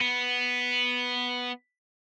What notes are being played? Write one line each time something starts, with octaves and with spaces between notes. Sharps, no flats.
B3